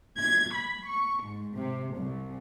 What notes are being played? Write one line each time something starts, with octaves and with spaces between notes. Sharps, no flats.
G#6
B5
C#6
G#2
C3
C2